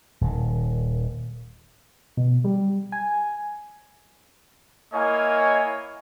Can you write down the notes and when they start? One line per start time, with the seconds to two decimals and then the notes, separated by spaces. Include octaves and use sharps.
0.21 D#1 D#3
2.17 B2
2.44 G3
2.92 G#5
4.93 A#3 E4 C#5 D#5 F5 G#5